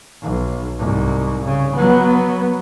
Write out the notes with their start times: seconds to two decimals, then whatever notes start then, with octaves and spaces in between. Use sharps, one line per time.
0.22 B1
0.79 C2 G#2
1.44 C#3
1.76 F#3 B3